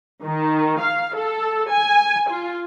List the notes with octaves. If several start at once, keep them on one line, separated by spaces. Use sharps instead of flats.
D#3
F5
A4
G#5
F4